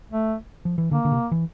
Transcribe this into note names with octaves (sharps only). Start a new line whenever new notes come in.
A3
F3
E3
D3 A#3
D3
C3
E3